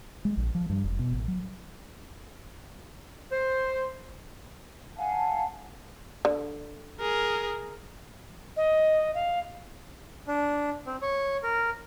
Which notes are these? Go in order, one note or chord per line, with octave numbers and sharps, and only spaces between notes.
G#3
A#1
F3
G2
F1
B2
A1
F#3
C5
F5 F#5 G#5 A5
D3
G#4 A#4
D#5
F5
D4
C4
C#5
A#4